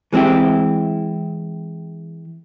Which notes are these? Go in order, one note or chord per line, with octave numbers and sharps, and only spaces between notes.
E3 G#3 C4 E4 G4